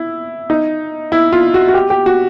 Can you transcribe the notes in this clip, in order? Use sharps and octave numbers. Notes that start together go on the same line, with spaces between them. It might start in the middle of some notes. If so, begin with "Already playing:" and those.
Already playing: E4
D#4
E4
F4
F#4
F#4
G4
G4
F#4